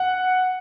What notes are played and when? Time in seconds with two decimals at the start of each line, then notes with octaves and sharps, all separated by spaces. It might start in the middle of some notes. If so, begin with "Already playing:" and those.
Already playing: F#5